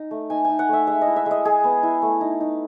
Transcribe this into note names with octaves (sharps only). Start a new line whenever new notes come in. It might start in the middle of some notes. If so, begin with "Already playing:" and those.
Already playing: D#4
A3
D#4 G#5
D#4 G#5
F#5
A3 E5
G#3 E5
D#5
E4
E5
G#3 D#5
G#3 G#4
B3
E4
A3
D#4
D#4